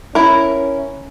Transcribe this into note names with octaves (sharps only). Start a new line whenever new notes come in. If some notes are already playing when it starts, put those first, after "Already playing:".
C#4 E4 A#4